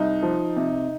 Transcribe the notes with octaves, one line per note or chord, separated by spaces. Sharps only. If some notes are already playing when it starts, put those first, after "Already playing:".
Already playing: C2 D#4
F3
C3